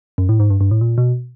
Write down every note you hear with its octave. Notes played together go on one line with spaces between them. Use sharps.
F#2
A2
G#2
G2
G2
A2
A#2
B2